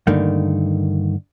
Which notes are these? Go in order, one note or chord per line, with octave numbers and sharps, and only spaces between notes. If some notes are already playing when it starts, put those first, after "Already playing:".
G2 D3 D#3 A3 A#3